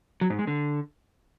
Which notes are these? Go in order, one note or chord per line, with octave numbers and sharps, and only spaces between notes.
F#3
G#2
G#3
D3